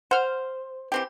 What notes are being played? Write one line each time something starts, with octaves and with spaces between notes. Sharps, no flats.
C5 F#5 F6
E3 C4 G4